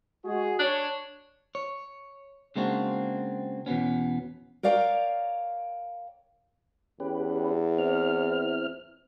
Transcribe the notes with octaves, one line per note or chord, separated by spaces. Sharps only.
G#3 F#4 G#4
D4 C#5
C#5
C#3 G#3 A#3 C4 D4 F#4
E2 B2 B3 C#4
A#4 C#5 D5 F5 G5 A#5
E2 C#4 G4 B4
C4 E4 F6